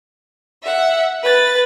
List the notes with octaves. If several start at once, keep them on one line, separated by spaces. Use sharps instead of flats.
E5 F#5
B4 A6